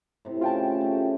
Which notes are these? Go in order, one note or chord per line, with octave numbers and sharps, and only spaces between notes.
A2 C3
C#3 C#4 F4 G5 A5
A3 G4